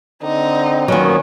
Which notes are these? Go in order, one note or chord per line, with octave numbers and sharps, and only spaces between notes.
D3 C4 D#4
A#2 D#3 F3 F#3 B3 C#4